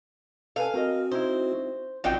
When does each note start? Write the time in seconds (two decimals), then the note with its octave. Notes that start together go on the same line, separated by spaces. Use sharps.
0.56 A4 B4 F5 G#5
0.74 C4 F#4 A#4 D#5
1.12 D#4 E4 C5
2.04 G#1 F#3 C4 D4 D#4 F4 F5 G5